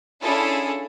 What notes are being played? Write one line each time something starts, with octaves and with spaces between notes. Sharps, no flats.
C#4 D4 E4 F4 G#4 A4